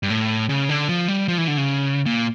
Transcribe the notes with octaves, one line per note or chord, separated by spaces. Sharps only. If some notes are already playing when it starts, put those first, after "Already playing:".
G2
A2
C#3
D3
F3
G3
F3
E3
D3
C#3
A#2